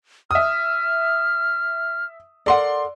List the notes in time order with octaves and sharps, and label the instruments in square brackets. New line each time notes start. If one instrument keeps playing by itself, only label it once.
[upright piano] E5 D#6 [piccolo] F6
[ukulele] A4 A#4 F#5 [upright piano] D5 C6